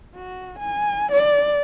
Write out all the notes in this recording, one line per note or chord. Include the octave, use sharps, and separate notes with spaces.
F#4
G#5
D5